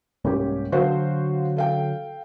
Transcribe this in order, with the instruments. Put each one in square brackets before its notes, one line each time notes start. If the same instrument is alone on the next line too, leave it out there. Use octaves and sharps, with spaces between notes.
[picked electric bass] C2 G#2 A#3 [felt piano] C#4 G4
[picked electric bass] D3 F#3 [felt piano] F#4 C5 F5
[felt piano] A4 F5 G5